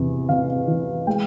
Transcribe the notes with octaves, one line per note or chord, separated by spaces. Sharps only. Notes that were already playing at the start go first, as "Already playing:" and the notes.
Already playing: E2 C3
C3 F5
E3
G#3 G5